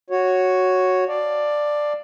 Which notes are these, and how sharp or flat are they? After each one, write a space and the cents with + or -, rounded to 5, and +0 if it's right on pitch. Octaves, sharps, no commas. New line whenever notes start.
F#4 +0 C#5 +0
D5 +10 F5 +0 A5 +0